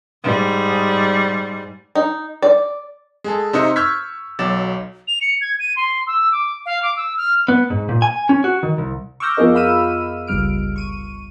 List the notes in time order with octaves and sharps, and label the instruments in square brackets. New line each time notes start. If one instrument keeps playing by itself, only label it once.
[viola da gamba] G#2 G3
[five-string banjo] D#4
D5
[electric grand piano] G#3 G#4 A4
C3 D#4 C5 D#5 E5 C#7
C#6 E6 F6 G6 G#6 B6
B1 F#3 D6 A6 E7
[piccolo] F7
C#7
G#6
D#7
C6
E6
D6
F5
D6
E6
F6
[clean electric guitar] B3
G#2
A#2
G#5
C#4
F#4
D#3
C2
[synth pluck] C#6 D6 E6 F6 G6 A#6
F2 B3 F4 G#4 A#4 D#5
F5 B5 E6 F6 D#7
G1 C#2 G3 F6 D7
C#6 D#7